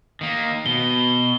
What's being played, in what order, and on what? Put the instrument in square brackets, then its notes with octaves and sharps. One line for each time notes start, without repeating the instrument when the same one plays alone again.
[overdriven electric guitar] D#3 A#3
[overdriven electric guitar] B2 [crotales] G7